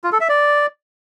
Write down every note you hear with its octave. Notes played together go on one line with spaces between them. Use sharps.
F4
A4
E5
D5